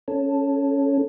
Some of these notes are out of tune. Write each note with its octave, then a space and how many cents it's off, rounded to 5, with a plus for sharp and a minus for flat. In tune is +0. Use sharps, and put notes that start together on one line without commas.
C#4 +0 A4 +0